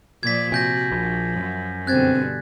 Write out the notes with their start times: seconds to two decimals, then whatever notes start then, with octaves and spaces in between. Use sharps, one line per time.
0.23 A#2 F3 D5 G#6 B6
0.52 C3 F#4 G#5 G6 A#6
0.92 A#1 F3
1.36 F#2
1.87 G2 B2 D3 C4 F#6 G#6 A6